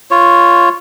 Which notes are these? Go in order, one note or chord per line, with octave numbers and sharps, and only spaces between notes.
F4 C#5